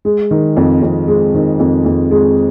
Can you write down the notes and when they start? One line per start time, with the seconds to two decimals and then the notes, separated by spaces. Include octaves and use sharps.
0.05 G#3
0.31 D#3
0.57 F2
0.82 F2
1.08 G#3
1.34 D#3
1.60 F2
1.85 F2
2.11 G#3